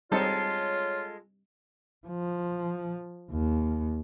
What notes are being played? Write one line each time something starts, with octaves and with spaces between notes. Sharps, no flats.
G3 G#3 C4 D#4 F4 A4 C#5
F3
D#2